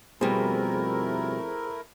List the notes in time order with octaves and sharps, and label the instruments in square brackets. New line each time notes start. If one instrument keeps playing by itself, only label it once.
[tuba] F2 [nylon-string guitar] B2 G3 [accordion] A3 E4 A#4 [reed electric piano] G#4 C5